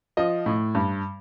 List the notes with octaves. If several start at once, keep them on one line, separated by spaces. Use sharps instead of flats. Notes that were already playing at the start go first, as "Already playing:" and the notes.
F3 D#5
A2
G2